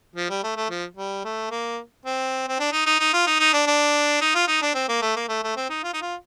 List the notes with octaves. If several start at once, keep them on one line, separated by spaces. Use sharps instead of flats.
F3
G3
A3
A3
F3
G3
A3
A#3
C4
C4
D4
D#4
D#4
D#4
F4
D#4
D#4
D4
D4
D#4
F4
D#4
D4
C4
A#3
A3
A#3
A3
A3
C4
D#4
F4
D#4
F4